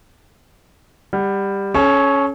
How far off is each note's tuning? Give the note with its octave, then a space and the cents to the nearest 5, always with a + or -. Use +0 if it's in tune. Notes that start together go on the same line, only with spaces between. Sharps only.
G3 +15 F#5 +35
C#4 +0 A4 -40 C#5 +0